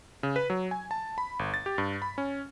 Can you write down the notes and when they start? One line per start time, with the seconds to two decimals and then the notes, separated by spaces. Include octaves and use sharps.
0.23 C#3
0.36 B4
0.50 F#3
0.71 G#5
0.91 A5
1.18 B5
1.39 G1
1.54 A6
1.66 G4
1.78 G2
2.02 B5
2.18 C#4